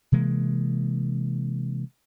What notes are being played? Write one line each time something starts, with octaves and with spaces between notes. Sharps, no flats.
C3 E3 G#3 A#3